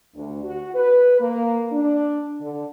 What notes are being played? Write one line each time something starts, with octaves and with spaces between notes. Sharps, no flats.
D2
F#4
B4
A#3
D4
D3